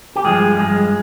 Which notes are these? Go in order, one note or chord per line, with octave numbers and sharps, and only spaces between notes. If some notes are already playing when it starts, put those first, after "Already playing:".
G4
G2 F3 G#3 G#4
G2 F3 G#3 G#4